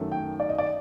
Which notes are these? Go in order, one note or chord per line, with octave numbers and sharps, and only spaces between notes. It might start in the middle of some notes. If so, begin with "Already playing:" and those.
Already playing: F#2 D#3 F#3 A3
G5
D5
D#5
D5